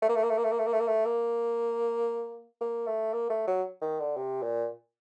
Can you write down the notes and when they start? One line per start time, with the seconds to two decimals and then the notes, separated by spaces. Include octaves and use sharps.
0.02 A3
0.09 A#3
0.16 A3
0.23 A#3
0.30 A3
0.38 A#3
0.44 A3
0.51 A#3
0.59 A3
0.67 A#3
0.73 A3
0.80 A#3
0.88 A3
1.05 A#3
2.61 A#3
2.87 A3
3.13 A#3
3.30 A3
3.47 F#3
3.82 D#3
4.00 D3
4.16 C3
4.43 A#2